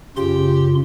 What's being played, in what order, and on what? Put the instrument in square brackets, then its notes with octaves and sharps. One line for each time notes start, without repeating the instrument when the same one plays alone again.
[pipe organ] F#2 F4 C6 [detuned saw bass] C#3 [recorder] G4